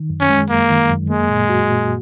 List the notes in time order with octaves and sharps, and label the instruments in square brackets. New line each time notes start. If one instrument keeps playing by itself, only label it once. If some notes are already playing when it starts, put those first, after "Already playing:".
Already playing: [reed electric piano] D#3
F#2
[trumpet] C#4
[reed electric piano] G#3
[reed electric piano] F#2 [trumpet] A#3
[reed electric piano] D#3
F#2
[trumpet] G#3 [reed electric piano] A#3
[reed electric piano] A#2
F#4
A#2